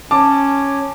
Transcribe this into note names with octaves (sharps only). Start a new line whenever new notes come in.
C#4 A5 D6